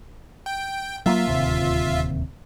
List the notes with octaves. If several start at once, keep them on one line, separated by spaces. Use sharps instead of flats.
G5
F#3 A3 A#3 F4 E5
D1 D#2 C3